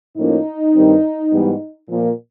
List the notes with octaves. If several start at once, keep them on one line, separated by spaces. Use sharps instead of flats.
A2 F3 A#3 C#4 D#4
G2 D#3 G3 C4
G#2 E3 G3 B3
A#2 F3 A#3